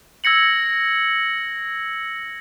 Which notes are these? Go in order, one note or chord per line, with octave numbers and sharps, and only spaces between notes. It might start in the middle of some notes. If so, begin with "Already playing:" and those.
E6 G#6 A#6 C#7 F#7